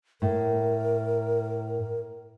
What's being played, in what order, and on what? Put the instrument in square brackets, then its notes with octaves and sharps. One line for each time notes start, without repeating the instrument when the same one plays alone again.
[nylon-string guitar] A2 [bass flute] A#4